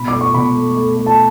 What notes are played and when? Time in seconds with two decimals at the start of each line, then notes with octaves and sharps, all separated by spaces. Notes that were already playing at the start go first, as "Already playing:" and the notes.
Already playing: B2 B5
0.08 D6
0.13 A3
0.21 C#6
0.34 B2 B5
0.55 A3
0.77 A3
0.97 A3
1.06 A5